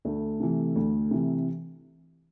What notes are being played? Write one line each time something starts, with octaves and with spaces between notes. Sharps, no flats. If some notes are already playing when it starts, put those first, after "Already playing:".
D2 A3
C3 E3
D2
C3 E3